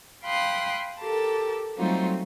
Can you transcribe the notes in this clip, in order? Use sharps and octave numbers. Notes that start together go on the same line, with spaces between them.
F5 G5 B5 C6 D#6 F#6
G4 A4 A#4 A5
F#3 G3 A3 C4 D#4 F4